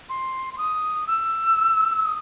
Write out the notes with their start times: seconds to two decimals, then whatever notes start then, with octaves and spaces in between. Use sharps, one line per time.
0.09 C6
0.53 C6
0.58 D#6
1.07 E6
2.05 D#6